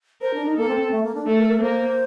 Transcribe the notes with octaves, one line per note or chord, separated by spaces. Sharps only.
A#4 C5
D4
D#4
A#3 A4
C4
C4
A3
A#3
D4
A3 A4
A#4
A#4
A#3 C5